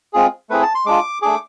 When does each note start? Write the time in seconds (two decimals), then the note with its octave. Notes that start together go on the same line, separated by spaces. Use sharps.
0.13 G#3 C4 F4 G#4
0.50 A3 C4 E4 G#4 B4
0.62 A5
0.75 C6
0.85 G#3 D4 F4 D6
1.22 A3 D4 G#4 D6